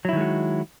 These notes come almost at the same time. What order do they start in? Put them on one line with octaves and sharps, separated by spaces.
F#3 E4 D#3 G#3 F#4